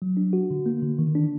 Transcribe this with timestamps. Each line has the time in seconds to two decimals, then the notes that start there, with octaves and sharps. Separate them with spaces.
0.02 F#3
0.17 D4
0.33 F#4
0.50 D3
0.66 A#3
0.83 D3
0.99 D#3
1.15 D4